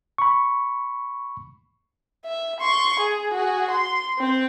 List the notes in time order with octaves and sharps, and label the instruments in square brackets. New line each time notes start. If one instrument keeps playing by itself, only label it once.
[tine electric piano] B5 C#6
[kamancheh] E5
C6 C#6
G#4
F#4 G#4
C6
C4 C5